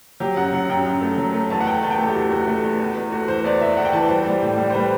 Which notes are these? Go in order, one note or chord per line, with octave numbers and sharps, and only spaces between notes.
F#3 G4
F#2 F#5
F#3 F#5
F#2 G5
F#2
A3
F#3
A3
E2 A5
F#5
E2 G5
E2 A5
G5
A3 A4
G4
E2 F#4
A3 F#4
A3
E2
E2
E2
A3 F#4
E3 C5
E2 D5
E2 E5
E2 F#5
G5
E3 A5
G3 C5
G3
A2
G3
C5
G3 B4